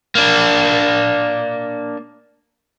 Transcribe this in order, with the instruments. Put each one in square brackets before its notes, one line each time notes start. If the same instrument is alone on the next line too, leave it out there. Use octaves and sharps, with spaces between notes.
[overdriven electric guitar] A#3 D4